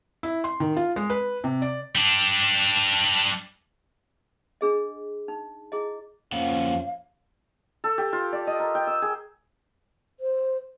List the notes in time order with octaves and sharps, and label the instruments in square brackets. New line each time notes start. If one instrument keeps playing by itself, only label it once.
[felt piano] E4
C6
D#3
F4
G#3
B4
C3
D5
[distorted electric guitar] G3 D4
[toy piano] D4 G#4 D#5
D#4
E4 G#4 D#5
[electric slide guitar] F2 A#3 F#5 [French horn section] F3 C#4 [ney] F5
[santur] A4
G4
F4
D5
D#5
A#4
G5
E6
G#4
[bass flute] C5